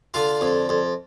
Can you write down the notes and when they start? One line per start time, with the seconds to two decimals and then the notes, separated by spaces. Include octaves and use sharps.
0.14 D3 F4
0.41 F2
0.69 F2